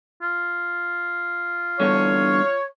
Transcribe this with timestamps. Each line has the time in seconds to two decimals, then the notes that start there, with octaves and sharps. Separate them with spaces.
0.22 F4
1.80 E2 G2 D3 C#5